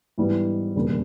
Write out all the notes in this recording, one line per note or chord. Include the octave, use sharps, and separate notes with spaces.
G#2 E3 G3 B3
E1 D#2 C#3 G3